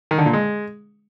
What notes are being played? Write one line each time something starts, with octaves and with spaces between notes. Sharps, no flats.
D#3
D3
A#2
G#3